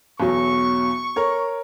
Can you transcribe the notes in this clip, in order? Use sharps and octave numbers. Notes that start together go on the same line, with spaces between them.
B1 E2 F#3 C#6
A#4 C#5